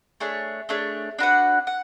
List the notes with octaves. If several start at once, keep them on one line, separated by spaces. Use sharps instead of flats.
A3 D4 G#4 C#5
A3 D4 G#4 C#5
D4 F#4 B4 F#5
F#5